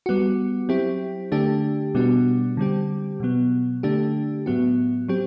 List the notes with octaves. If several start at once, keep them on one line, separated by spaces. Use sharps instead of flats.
G3 B3 F#4
F#3 C4 E4 G4
D3 A3 D4 G4
B2 G3 B3 D4 F#4
D3 G3 C4 G4
B2 F#3 B3
D3 A3 D4 G4
A2 F#3 B3 F#4
F#3 C4 G4